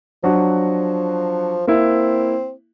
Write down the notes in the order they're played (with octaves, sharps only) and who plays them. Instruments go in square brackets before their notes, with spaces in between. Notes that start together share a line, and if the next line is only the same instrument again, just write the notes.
[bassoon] F3 [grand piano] F#3 D4 F#4
[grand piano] A#3 E4 [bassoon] C4